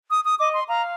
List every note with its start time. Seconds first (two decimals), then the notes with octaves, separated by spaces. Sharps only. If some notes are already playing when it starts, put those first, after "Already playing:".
0.11 D#6
0.25 D#6
0.39 D#5 D6
0.54 C6
0.68 F5 A#5